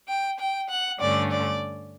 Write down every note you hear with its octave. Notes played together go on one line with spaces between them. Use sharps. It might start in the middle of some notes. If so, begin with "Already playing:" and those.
G5
G5
F#5
G2 D3 A3 C#4 D5
D5